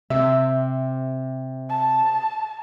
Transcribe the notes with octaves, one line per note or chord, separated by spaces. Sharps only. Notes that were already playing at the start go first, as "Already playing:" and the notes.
C3 E5
A5